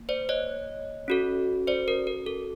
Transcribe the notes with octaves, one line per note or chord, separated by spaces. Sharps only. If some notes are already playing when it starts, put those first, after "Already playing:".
Already playing: A#3
C5 D5
C#5 D#5
C#4 F#4 A4
C5 D5
A#4
A#4
A4